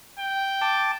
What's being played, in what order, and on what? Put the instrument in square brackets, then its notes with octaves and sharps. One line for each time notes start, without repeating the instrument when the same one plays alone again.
[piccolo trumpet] G5
[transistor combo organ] A5 D6